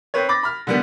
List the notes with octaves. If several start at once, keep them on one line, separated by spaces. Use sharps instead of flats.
C4 B4 C#5
B5 D6 A6 A#6
B5 F6
D3 G3 B3